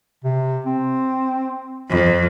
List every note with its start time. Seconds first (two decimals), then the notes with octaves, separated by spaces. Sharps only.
0.24 C3
0.66 C4
1.89 F2